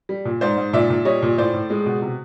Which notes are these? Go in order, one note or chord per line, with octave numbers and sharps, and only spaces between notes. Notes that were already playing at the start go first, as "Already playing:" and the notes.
G3
A#2
G#2 C5 D5
G#2
A#2 D5 E5
A#2
G3 C#5 D#5
A#2
A2 C5 D5
A2
G#3
B2
C3